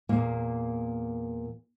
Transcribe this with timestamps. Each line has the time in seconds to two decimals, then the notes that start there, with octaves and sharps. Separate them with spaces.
0.09 E2 A#2 A#3